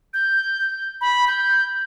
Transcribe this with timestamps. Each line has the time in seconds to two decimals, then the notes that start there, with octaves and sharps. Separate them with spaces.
0.14 G6
1.01 B5
1.28 G6